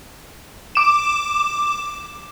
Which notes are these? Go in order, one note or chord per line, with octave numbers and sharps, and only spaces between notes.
D6 E7